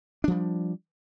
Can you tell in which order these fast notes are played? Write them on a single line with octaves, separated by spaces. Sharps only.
D4 F3 G3